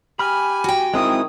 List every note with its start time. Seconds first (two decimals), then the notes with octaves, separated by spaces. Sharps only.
0.19 G4 G#5 B5 F6
0.64 F#4 G5
0.94 D#3 G#3 C4 E4 D#6